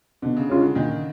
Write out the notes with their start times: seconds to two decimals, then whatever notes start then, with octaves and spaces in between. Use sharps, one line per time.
0.22 B2 D3
0.36 C#3
0.49 D3 G#3 C#4 F4
0.62 D3
0.75 A#2 D#3